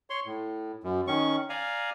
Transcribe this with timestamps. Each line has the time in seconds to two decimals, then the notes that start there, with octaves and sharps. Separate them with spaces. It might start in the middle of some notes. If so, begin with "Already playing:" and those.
0.10 C#5 C6
0.26 A2
0.83 F#2
1.07 D#3 C#4 C#6
1.49 D5 F5 G#5 A#5